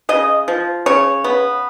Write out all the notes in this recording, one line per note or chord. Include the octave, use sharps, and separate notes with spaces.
C#3 D#5
F3
C#3 C#5
B3